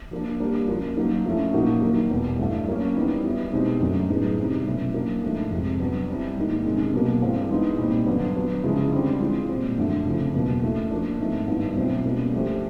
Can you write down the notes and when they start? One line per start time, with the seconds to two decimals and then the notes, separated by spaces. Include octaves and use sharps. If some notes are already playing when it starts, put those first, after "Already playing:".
0.11 F3 A#3 D4
0.40 G3 A#3 D4 G4 A#4
0.68 F3 A#3 C#4 F4
0.96 F#3 A#3 D#4
1.25 F3 A3 C#4 E4
1.53 A#2 F3 A#3 D#4 F#4
1.82 D#3 F#3 A#3
2.10 E2 B2 G3
2.39 G2 E3 A3
2.68 F#3 A#3 C#4
2.95 E3 G3 B3 D#4
3.25 G3 B3 E4
3.52 B2 G#3 C4 D#4 G4
3.80 F#2 D3 F#3 A3 C#4
4.09 A2 F#3 B3 D#4 G#4
4.38 C3 E3 G3 C4 D#4
4.66 B2 F#3 A3 C#4 E4
4.94 F#3 A#3 D4
5.23 G#2 F3 A3 D4
5.51 F2 C3 F3 G#3
5.80 F#3 B3 D4
6.08 G3 C4 E4
6.36 G#2 D#3 G3 A#3 D#4
6.65 C3 D#3 G#3 C#4
6.94 B2 F#3 A#3
7.22 G2 E3 G#3 C4
7.51 E3 G#3 B3 D#4
7.78 A#2 G3 C4 D#4
8.07 G2 D3 F#3 B3
8.36 F#3 B3 D4
8.63 C#3 F3 G#3 C#4 E4
8.92 D3 G3 C4 F4
9.20 E3 G#3 C4 F4
9.49 A#2 G3 C4
9.77 F#2 D3 F3 A3 D4
10.06 C#3 F3 A3 C4
10.33 E2 B2 F#3 A#3
10.63 E3 A3 C#4
10.90 F3 A#3 D4
11.19 G#2 F3 A3 C4
11.48 G2 D#3 G3 B3 E4
11.75 B2 F#3 A3 C4 E4
12.04 B2 G3 A#3 C#4
12.33 F3 A3 D4 G4 C5